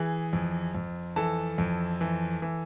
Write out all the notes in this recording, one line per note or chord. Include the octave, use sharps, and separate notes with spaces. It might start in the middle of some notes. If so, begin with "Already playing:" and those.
Already playing: E3 G#4
F2
F2
E3 A4 A5
F2
E3
E3